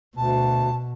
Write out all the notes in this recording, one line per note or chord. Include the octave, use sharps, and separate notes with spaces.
D2 B2 A5